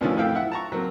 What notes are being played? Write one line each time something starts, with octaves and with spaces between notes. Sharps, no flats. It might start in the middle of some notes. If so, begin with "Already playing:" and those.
D2 B2 D#3 F3 C#4 E4
F2 A2 F3 E4 F5 G5
E4 E5 F#5
A5 A#5 C#6
F#3 A#3 C4